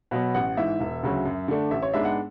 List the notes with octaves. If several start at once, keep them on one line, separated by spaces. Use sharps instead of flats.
B2 F#3 B3
A1 F#5
G#2 E3 E5
E1
D2 C#3 F#3 C#4
F#2
D3 A3 D4
A1 E5
C#5
G#2 G#3 B3 D4 E5
F#5